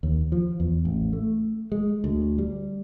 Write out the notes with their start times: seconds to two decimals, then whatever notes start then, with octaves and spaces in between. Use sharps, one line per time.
0.03 D#2
0.32 F3
0.60 E2
0.85 A1
1.13 A3
1.72 G#3
2.04 D2
2.38 G3